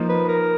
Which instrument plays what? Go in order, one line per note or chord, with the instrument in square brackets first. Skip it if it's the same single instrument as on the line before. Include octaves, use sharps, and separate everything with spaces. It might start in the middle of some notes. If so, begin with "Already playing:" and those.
Already playing: [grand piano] F3 A#3 D#4
[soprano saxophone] B4
A#4